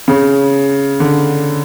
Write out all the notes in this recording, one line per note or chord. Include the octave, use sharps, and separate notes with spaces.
C#3
D3